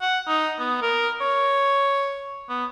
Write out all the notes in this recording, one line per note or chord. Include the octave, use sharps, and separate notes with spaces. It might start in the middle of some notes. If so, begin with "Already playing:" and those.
F#5
D#4
B3
A#4
C#5
B3